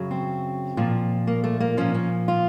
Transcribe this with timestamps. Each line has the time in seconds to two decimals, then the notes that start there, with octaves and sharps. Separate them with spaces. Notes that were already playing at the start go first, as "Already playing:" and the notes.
Already playing: F#2 C#3 F#3
0.11 C4
0.77 A#2 F3
1.27 A#3
1.44 A3
1.60 A#3
1.77 A#2 F3 C#4
1.94 C#4
2.28 F4